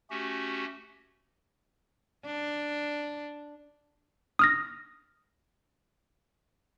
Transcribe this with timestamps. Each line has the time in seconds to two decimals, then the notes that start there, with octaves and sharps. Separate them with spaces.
0.10 A3 C#4 F#4 G4
2.26 D4
4.39 D#6 F6 A#6